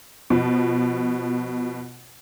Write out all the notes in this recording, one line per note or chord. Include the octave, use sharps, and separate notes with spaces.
B2 F3